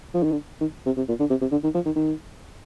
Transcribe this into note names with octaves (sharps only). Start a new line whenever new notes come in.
F3
D#3
D3
D#3
C3
C3
A#2
D3
C3
C3
D3
D#3
F3
D#3
D#3